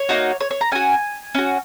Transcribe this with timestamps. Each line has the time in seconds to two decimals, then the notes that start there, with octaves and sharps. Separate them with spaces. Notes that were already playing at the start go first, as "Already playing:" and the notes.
Already playing: C#5
0.09 A#3 D#4 F#4
0.41 C#5
0.51 C#5
0.61 A#5
0.72 C#4 F#4 G#5
1.35 C#4 F#4